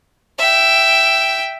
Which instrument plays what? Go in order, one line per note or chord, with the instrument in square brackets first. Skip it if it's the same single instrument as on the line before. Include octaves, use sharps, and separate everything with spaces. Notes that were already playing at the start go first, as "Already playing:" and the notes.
[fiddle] E5 G5